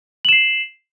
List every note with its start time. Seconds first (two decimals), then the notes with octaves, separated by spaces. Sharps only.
0.25 F#7
0.29 E7
0.33 C7